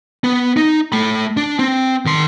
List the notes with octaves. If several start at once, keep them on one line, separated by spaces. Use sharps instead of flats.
B3
D#4
A3 B5
D4
C4
D#3 C6